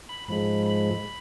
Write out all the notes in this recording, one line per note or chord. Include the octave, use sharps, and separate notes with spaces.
B5
G#2 F3 G#3 B5
B5